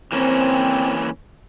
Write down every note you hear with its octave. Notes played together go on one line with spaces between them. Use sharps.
E3 A#3 C4 C#4